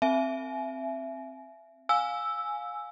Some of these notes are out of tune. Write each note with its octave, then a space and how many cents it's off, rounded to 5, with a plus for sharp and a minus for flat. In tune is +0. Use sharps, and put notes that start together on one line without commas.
C4 +5 E5 +20 G#5 +35
F5 +25 G#5 +0 E6 +0